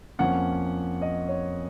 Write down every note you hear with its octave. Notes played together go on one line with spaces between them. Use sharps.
F2 F3 A#3 C#4 F#5
D#5
C#5